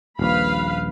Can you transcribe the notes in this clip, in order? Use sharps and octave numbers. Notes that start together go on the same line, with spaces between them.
D#1 A#1 B4 F5 B5